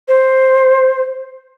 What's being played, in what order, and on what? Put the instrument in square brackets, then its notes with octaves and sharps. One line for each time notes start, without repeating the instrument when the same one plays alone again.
[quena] C5